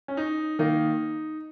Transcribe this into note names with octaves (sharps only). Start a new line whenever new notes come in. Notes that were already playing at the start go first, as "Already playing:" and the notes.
C#4
D#4
D#3 A#3 D#4